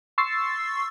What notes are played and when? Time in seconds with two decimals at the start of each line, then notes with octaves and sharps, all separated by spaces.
0.18 C6 C#6 E6 A6 C7